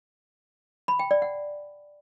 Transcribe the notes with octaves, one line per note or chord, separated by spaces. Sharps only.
B5
G5
D5
F#5